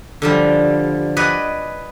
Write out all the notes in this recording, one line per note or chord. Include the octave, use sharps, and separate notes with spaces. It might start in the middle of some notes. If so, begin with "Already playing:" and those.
D3 F3 G3
B4 D5 D#5 F#5 G#5